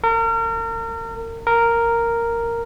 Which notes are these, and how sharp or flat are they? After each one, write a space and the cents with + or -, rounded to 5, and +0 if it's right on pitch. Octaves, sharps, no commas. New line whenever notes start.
A#4 -35
A#4 -5